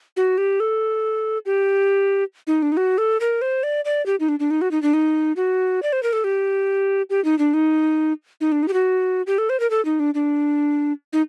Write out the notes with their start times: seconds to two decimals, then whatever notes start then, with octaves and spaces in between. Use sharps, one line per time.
0.17 F#4
0.38 G4
0.60 A4
1.46 G4
2.47 D#4
2.62 D4
2.72 D#4
2.77 F#4
2.98 A4
3.20 A#4
3.42 C5
3.63 D5
3.85 D5
4.06 G4
4.20 D#4
4.29 D4
4.40 D4
4.51 D#4
4.61 F#4
4.71 D#4
4.83 D4
4.94 D#4
5.36 F#4
5.83 D5
5.93 C5
6.03 A#4
6.13 A4
6.24 G4
7.10 G4
7.25 D#4
7.39 D4
7.54 D#4
8.41 D#4
8.52 D4
8.63 D#4
8.68 G4
8.73 F#4
9.27 G4
9.38 A4
9.50 C5
9.60 A#4
9.70 A4
9.85 D#4
10.00 D4
10.14 D4
11.13 D#4